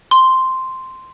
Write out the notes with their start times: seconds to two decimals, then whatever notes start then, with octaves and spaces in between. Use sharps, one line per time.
0.11 C6